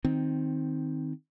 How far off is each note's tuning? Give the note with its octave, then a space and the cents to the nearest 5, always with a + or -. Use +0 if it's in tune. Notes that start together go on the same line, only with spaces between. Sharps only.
D#3 +0 C4 +0